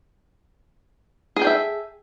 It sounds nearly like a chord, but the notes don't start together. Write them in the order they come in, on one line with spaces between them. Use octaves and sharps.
G#4 A4 G5 D5 E5